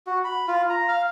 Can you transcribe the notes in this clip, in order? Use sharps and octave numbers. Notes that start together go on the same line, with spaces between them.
F#4
B5
F4
A#5
F5